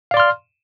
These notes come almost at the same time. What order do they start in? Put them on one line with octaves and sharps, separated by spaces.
F5 D5 C6 F6